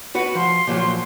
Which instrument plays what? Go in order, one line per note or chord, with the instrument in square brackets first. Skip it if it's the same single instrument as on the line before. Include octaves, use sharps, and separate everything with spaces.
[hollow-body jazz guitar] F#4 B4 [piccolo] C#7
[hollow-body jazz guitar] F3 [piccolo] C6
[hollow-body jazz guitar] A#2 F3 F#3